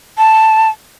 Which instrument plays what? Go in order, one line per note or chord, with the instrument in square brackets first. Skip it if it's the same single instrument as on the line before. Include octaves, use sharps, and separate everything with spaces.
[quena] A5